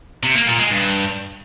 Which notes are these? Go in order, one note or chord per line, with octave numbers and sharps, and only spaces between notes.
C3
A#3
A#2
G#3
G2